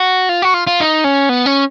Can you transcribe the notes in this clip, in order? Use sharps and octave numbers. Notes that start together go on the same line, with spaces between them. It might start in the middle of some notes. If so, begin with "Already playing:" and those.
Already playing: F#4
F4
F#4
F4
F4
D#4
C#4
B3
C#4